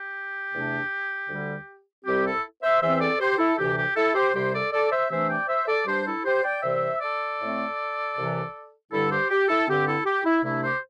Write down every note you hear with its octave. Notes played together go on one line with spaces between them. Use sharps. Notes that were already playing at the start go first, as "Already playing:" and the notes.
Already playing: G4
E2 C3 A3 D4
D2 D3 G3
C2 C3 G3 C4 G4
E4 A4
C5 E5
E2 E3 C4 C5 E5
A4 D5
G4 C5
E4 A4
D2 C3 E3 G4
G4
E4 A4
G4 C5
C2 C3 G3 G4 C5
A4 D5
A4 D5
C5 E5
C3 E3 A3 D4 C5 E5
D5 G5
C5 E5
A4 D5
G2 G3 D4 G4 C5
E4 A4
G4 C5
D5 G5
C2 C3 E3 G3 C4 C5 E5
A4 D5
A2 A3 C4
C2 C3 E3
G2 D3 G3 E4 A4
G4 C5
G4
E4 A4
G2 D3 C4 G4
E4 A4
G4
E4
C2 C3 A3 D4 E4
G4 C5